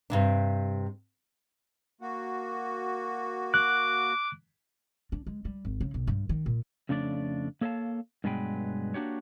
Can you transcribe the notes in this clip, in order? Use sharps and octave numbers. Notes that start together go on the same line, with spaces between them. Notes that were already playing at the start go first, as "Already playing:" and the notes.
G2 C3 D4
A#3 F#4
D6 F#6
D4
G#3
G3
G#1
C#3
B1
G2
D#3
A#2
F2 C#3 A3 D4 D5
A#3 A4 C#5 D#5 F5 A5
G2 B2 F#3 G#3 B4 G5
A#3 D4 F#4 G4 C#5